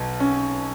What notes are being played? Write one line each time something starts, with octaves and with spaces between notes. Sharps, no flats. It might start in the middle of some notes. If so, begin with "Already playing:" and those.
Already playing: B1 B2
C#4